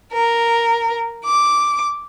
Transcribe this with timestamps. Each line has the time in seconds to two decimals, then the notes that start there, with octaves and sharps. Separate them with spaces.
0.12 A#4
1.24 D6